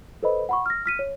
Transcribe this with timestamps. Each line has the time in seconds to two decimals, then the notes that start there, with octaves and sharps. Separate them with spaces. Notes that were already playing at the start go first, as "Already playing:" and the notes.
0.23 A4 B4 C5 D#5 B5
0.49 F#5 B5 C#6
0.66 F6 A#6
0.86 F6 B6 D#7
0.99 C#5